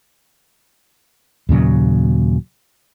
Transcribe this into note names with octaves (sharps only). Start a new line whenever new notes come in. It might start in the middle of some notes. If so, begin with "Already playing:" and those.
D#2 A#2 C#3 F#3